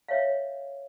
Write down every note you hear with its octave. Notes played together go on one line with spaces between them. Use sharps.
C#5 E5 F5